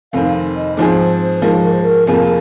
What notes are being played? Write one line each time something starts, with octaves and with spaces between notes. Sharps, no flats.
F1 F2 D#3 C4 F5
D#5
G#2 F3 C4 G#4 C5
G#2 F3 G#3 A#4
C5
A#4
C5
A#4
F1 F2 F3 A#3 G#4